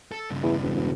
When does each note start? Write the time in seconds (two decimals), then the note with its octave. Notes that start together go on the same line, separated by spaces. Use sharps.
0.12 A4
0.30 G2 C#3
0.43 E2
0.62 E1
0.75 E1